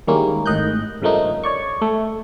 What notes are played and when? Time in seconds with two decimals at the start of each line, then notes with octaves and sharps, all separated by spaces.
0.07 D#3 G3 G#3 A#3 C#4 E4
0.46 G#1 A2 D#3 D#5 F#6 G6
1.02 G2 C#3 F3 A3 A#3 D#4
1.44 C#5 D5 C#6
1.82 A3